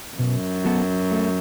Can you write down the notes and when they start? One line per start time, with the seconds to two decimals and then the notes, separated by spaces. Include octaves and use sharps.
0.18 F#2 B2
0.64 F#3 B3 F#4 A4
1.11 A3